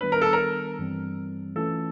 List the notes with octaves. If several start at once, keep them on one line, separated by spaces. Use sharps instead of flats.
D#3 G3 B3 D4 B4
A#4
A4
A#4
G2 E3 G3 C4
E3 A3 C#4 F4 A4